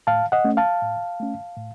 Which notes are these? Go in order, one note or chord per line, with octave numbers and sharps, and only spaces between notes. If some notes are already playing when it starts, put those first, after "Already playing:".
A2 F5 A5
D#5 F#5
A3 C#4
F5 A5
A2
A3 C#4
A2